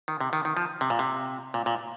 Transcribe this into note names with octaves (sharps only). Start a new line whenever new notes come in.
D#3
C3
D#3
D#3
F3
C3
A#2
C3
A#2
A#2